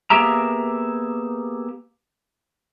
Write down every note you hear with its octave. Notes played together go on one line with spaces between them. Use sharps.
A#3 B3 G4 G#4 E5 A#5